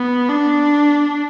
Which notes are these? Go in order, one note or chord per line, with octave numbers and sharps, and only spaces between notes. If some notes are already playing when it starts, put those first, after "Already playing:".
Already playing: B3
D4